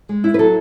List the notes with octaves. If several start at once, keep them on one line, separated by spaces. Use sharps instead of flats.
G#3
E4
B4
F#3 A4